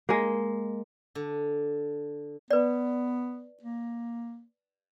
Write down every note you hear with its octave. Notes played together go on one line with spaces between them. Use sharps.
G#3 A#3
D3
B3 B4 D5
A#3